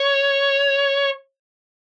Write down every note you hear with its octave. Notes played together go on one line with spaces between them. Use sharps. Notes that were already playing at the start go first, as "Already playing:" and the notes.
Already playing: C#5